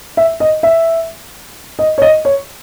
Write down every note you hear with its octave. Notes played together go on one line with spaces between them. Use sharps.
E5
D#5
E5
D#5
C#5
D#5
C#5